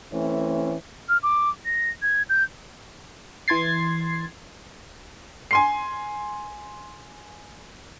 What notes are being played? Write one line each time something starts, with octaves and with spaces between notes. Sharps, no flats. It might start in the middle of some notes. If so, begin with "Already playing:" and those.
E3 A3 C4 C#4
F6
D6
A#6
G#6
G6
E3 C6 G#6 A6 C7
G#5 C6 C7